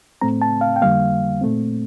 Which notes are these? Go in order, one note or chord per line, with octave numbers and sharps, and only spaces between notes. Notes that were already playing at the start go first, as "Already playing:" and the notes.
A2 A3 C4 A#5
A5
F5
G5
F2 D3 G3 A#3 F5
A#2 A3 C4